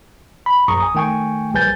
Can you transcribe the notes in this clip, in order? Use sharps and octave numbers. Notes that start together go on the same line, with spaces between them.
B5
A#1 F#2 A#5 C#6 D#6
G#5 D#6
D#3 A3 G5 G#5 C#6
A#1 G3 B4 G#5 G6 A6